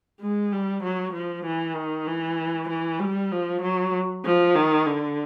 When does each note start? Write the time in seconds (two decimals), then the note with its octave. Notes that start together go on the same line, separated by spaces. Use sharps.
0.21 G#3
0.52 G3
0.83 F#3
1.13 F3
1.45 E3
1.76 D#3
2.07 E3
2.69 E3
2.99 G3
3.32 F3
3.62 F#3
4.25 F3
4.55 D#3
4.86 D3